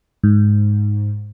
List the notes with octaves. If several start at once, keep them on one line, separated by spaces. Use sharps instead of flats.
G#2